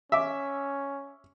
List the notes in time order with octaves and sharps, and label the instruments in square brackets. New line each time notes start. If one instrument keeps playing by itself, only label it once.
[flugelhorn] C#4 [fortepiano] E5 D6